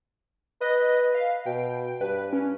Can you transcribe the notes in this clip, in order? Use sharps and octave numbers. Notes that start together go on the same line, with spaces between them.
B4 D#5
F5
B2 G5
G2 B4
C#4